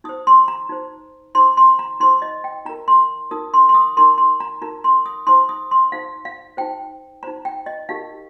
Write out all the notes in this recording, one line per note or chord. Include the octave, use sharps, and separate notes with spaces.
D#4 C5 D#6
C6
A#5
D#4 C5
D#4 C5 C6
C6
A#5
D#4 C5 C6
D#5
G5
D#4 A#4 A#5
C6
D#4 A#4 D#6
C6
C6
D#6
D#4 A#4 C6
C6
A#5
D#4 A#4 A#5
C6
D#6
D#4 C5 C6
D#6
C6
D#4 C5 F5
F5
D#4 C5 G5
D#4 C5 A#5
G5
D#5
D#4 G4 A#4 F5